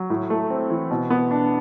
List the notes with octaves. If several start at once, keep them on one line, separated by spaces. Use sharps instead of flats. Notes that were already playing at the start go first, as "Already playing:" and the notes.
Already playing: F#3
A2
A3
C4
E3
B2
B3
D4